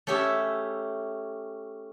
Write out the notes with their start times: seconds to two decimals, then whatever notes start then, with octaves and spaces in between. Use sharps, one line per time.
0.07 A3 C#4 G4 G#4 E5